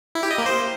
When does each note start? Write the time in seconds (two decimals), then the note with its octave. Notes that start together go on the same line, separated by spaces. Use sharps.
0.15 E4
0.23 G4
0.31 D#5
0.38 A#3
0.46 C5